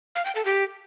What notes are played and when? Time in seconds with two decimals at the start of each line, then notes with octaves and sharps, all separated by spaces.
0.15 F5
0.25 G5
0.35 A4
0.45 G4